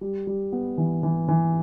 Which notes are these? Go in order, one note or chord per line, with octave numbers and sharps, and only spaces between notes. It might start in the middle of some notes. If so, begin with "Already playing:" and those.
G3
G3
B3
E3
E3
E3